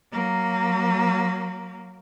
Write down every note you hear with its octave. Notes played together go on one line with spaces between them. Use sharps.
F#3 A#3